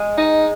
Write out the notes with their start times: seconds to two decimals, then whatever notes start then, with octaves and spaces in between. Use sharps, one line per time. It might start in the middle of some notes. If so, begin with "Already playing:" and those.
Already playing: G#3
0.18 D#4